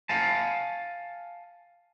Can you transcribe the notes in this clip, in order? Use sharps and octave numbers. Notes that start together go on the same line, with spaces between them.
F5 G#5 A5